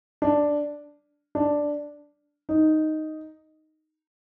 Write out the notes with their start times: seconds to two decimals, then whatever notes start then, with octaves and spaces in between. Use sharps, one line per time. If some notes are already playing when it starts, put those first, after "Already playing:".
0.22 D4
1.35 D4
2.49 D#4